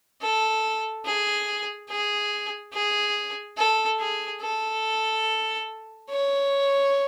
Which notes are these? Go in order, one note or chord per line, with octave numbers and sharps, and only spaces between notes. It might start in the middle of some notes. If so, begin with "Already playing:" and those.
A4
G#4
G#4
G#4
A4
G#4
A4
C#5